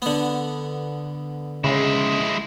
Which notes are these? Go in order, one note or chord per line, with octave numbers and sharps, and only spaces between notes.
D3 B3
C#3 G#3 E4